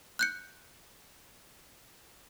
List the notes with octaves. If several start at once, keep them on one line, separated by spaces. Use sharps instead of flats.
F#6 G6 C#7